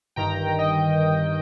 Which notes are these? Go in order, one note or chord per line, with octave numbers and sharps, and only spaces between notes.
G1 G2 D#3 G5 A#5
D#5 G5